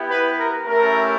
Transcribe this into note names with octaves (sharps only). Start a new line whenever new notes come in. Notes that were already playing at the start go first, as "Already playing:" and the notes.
Already playing: B3 E4 G4
B4
A#4
A3 C#4 E4 G4 A#4